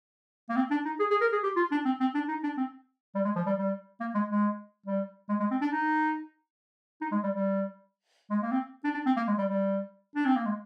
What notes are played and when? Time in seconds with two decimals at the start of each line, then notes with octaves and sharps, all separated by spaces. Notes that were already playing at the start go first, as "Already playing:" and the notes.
0.49 A#3
0.56 C4
0.71 D4
0.85 D#4
0.99 G#4
1.10 G#4
1.21 A#4
1.32 G#4
1.43 G4
1.56 F4
1.71 D4
1.85 C4
2.00 C4
2.14 D4
2.28 D#4
2.43 D4
2.57 C4
3.15 G3
3.25 G#3
3.36 F3
3.46 G3
3.57 G3
4.00 A#3
4.14 G#3
4.29 G#3
4.86 G3
5.29 G#3
5.40 G#3
5.51 C4
5.61 D4
5.72 D#4
7.01 D#4
7.12 G#3
7.23 G3
7.33 G3
8.30 G#3
8.42 A#3
8.51 C4
8.84 D4
8.94 D4
9.06 C4
9.17 A#3
9.27 G#3
9.38 G3
9.49 G3
10.15 D4
10.26 C4
10.36 A#3
10.45 G#3